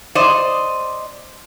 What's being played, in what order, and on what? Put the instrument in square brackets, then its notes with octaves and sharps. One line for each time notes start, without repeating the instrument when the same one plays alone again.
[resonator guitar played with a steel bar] C5 D5 D#5